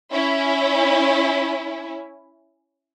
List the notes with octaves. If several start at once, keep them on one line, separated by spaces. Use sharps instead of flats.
C#4 E4